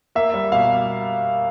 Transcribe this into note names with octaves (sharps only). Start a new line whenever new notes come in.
A#3 E5
G3
B2 F5